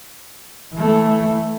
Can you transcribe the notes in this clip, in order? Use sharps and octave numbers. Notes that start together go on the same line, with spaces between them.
E3 A3